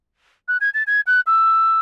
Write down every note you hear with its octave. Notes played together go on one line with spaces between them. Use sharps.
F#6
G#6
A6
G#6
F#6
E6